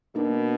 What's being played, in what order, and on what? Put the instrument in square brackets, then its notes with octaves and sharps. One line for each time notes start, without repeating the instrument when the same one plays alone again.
[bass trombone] B2 [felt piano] A#3 D4